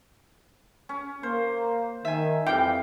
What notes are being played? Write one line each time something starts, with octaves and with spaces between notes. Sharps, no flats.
C#4
A#3 C5
D#3 E5 G#5
F2 E3 G3 F5 G5